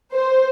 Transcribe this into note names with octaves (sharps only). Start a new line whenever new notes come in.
C5